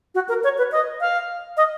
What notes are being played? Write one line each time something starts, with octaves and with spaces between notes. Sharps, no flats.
F#4
A#4
C#5
B4
D#5
F5
D#5